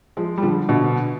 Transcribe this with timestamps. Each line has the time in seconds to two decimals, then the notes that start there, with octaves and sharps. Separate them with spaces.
0.17 F3 G#3
0.38 G3
0.42 D3 F3
0.69 B2 D3